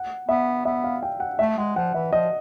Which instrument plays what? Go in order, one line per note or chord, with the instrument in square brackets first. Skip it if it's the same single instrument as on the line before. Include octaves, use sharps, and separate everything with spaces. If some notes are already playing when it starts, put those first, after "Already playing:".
Already playing: [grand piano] F#5
[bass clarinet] B3 [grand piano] E5
[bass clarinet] B3 [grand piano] E5
[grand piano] F5
G5
F#5
[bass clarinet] A3 [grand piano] E5
[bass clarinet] G#3 [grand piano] F#5
[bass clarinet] F3 [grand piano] F#5
[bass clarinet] E3 [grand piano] E5
[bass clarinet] F3 [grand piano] D#5